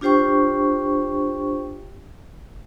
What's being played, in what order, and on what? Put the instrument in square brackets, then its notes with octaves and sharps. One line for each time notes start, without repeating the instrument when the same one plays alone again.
[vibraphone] D4 F4 G4 C5 G5 C#6